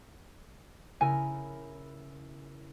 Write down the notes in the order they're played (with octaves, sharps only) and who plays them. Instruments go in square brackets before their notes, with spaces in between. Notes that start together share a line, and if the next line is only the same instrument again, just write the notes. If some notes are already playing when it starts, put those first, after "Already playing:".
[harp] C#3 E4 A#4 [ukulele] G#5